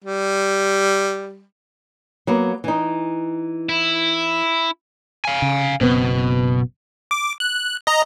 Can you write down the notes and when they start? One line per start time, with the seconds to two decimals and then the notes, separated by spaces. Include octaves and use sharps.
0.05 G3
2.27 F#3 A#3 B3
2.64 E3 D#4
3.69 E4
5.25 F5 G#5
5.42 C#3
5.81 F#1 B2 B3 C4
7.11 D6
7.40 F#6
7.87 D#5 A#5